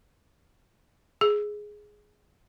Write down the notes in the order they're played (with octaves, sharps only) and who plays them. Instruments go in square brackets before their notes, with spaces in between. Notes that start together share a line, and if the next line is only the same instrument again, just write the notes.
[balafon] G#4